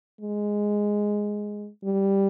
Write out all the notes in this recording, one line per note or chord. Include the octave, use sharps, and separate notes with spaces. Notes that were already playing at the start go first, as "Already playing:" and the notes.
G#3
G3